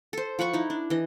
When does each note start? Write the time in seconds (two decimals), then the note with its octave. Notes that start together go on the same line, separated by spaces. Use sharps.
0.13 A4 C5
0.39 F3 F#5 B5 C#6
0.53 D#4 E4
0.70 D4
0.90 E3 D#5